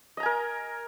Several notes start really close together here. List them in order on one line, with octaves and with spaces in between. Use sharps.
D#5 A#5 G#5 A#4